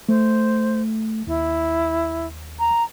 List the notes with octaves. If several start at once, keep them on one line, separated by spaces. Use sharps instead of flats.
A3 C5
D#2 E4
A#5